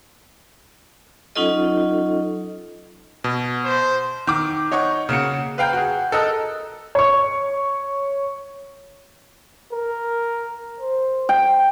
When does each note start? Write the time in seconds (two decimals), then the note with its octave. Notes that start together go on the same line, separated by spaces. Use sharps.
1.36 F#3 C#4 D#4 F4 A4 D#5
3.24 B2
3.65 C5
4.27 D#3 D6
4.71 D#4 C#5 F#5 C#6
5.09 C#3 A#3 F#4 C#7
5.58 B4 F5 G5 A#5 G6
5.73 F#4 G#4
6.12 A4 A#4 D#5 E6 F#6
6.95 C#5 C#6
9.72 A#4
10.80 C5
11.29 G5